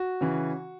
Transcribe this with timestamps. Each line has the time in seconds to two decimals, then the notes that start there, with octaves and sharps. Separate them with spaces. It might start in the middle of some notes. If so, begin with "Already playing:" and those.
Already playing: F#4
0.21 C#3 E3